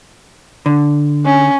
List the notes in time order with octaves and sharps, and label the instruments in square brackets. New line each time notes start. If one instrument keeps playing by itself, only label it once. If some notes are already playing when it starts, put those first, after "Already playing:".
[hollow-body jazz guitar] D3
[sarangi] C#4